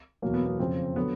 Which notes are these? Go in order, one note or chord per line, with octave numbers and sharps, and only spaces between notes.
E2 B2 F#3 A#3
B3
B3
F2 C#3 F3 C4
D3 F#3 B3